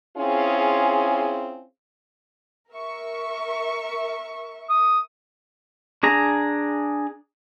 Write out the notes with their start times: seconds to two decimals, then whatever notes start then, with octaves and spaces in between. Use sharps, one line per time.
0.17 C4 C#4 E4 F4 G#4
2.71 A#4 E5 C#6
4.69 D#6
6.03 D4 G#4 A#5